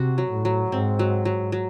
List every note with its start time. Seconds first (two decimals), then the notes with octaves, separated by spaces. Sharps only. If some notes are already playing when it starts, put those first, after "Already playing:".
Already playing: C3 F#4
0.18 F#3
0.32 A2
0.45 F#3
0.72 G#2 C4
0.99 F#3
1.25 F#3
1.52 F#3